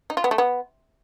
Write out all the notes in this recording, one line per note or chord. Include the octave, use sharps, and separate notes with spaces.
D#4
F4
B3
A3
B3